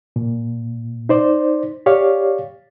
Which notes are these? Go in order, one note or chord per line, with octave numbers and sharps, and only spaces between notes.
A#2
D#4 C5 D5
G4 C#5 D5 F5